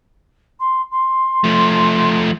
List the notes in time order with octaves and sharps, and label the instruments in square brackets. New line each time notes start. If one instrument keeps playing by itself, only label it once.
[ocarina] C6
C6
[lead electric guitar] F3 A3